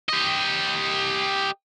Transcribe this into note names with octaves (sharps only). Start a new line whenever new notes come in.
G4 D#5